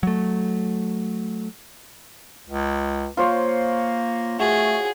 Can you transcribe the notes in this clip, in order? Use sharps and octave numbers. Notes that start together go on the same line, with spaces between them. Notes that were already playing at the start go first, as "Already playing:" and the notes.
F#3 A3
C#2
A#3 F4 C5 C#5
A3 F#4 G#4